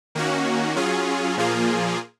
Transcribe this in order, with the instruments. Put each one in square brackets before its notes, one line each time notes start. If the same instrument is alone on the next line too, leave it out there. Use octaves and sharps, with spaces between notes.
[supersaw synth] D#3 A#3 C#4 F#4
F#3 C#4 F4 G#4
A#2 F3 A#3 F4 G#4